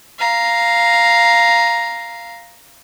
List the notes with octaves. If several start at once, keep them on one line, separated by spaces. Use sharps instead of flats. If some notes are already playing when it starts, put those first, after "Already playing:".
F5 A#5